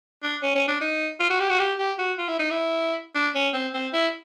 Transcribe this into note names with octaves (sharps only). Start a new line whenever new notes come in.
D4
C#4
C#4
D4
D#4
F4
F#4
G4
F#4
G4
G4
F#4
F4
E4
D#4
E4
D4
C#4
C4
C4
E4